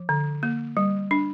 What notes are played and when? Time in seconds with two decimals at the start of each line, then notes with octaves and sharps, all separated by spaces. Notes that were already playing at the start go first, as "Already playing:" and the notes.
Already playing: F3
0.09 D3
0.43 A#3
0.77 G3
1.11 D4